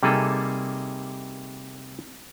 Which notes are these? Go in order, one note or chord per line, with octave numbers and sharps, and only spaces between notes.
C3 G3 A#3 D#4 G#4 A4